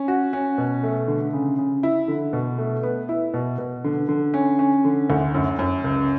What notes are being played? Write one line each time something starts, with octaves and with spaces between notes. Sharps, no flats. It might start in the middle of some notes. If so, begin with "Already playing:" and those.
Already playing: C#4
F#4
C#4
B2
A3
D3
C#3
C#3
E4
D3
B2
A3
B3
E4
B2
B2
D3
D3
C#4
C#4
D3
D2
F#2
F#2
C#2